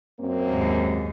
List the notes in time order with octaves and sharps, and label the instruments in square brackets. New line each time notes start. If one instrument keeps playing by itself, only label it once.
[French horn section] F#2 A#3 C4
[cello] D#2 G#2